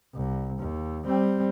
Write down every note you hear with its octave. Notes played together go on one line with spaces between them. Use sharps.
C2
D#2
G3 C4